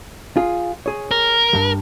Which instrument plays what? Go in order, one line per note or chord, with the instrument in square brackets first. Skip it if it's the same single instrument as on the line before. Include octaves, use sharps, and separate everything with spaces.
[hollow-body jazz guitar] F4 G#4
G#4 C#5
[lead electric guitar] A#4
[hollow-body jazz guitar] G2 G3